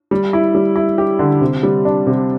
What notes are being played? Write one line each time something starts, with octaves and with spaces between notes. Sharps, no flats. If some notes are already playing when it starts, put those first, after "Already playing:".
G3
E4
G3
E4
G4
D3
C3
G3
D4
C3